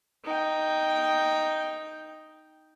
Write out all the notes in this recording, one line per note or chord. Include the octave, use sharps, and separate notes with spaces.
D#4 G5